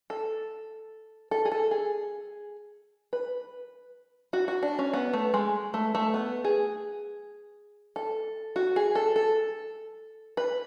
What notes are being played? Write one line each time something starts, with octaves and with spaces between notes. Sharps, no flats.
A4
A4
G#4
A4
G#4
B4
F#4
F#4
D4
C#4
B3
A3
G#3
A3
A3
B3
G#4
A4
F#4
G#4
A4
A4
B4